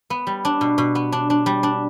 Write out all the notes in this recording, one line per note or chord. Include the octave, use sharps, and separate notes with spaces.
B3
G3
D4
B2
B2
B3
D4
D4
G3
D4